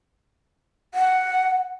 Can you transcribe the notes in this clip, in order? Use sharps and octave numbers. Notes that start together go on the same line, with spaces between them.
F#5